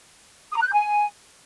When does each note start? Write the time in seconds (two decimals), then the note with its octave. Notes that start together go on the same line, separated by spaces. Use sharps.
0.51 D#6
0.56 A#5
0.61 F#6
0.66 G6
0.71 G#5